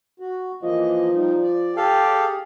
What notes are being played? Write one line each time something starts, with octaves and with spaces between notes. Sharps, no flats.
F#4
E3 F3 A#3 D#5
G3 D#4
D5
G4 A4 F5
G#4